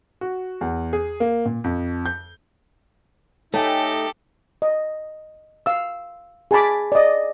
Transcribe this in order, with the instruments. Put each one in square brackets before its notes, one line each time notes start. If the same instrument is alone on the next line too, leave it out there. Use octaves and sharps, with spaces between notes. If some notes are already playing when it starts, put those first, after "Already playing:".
[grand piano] F#4
E2
G#4
A#3
A#2
F2
G6
[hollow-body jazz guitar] A3 [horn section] D#4 [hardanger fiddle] G4 A4 [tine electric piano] C#5 G5 G#5
[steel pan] D#5
F5 E6
G#4 G#5 A5 B5 D6
D5 D#5